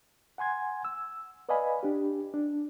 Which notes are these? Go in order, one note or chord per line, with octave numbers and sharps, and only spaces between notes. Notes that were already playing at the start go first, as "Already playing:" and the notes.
F#5 G#5 C6 G#6
E6
B4 D5 D#5 F5 G#5 B5
D4 G4
D4